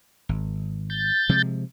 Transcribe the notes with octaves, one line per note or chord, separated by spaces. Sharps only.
G#1
G6 A6
C3 F3 G#3